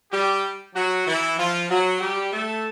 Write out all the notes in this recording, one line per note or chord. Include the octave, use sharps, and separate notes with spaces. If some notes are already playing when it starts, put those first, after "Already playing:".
G3 G4
F#3 F#4
E3 E4
F3 F4
F#3 F#4
G3 G4
A3 A4